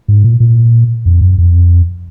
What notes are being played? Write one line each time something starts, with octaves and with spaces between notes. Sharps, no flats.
G#2
A#2
A#2
F2
F#2
F2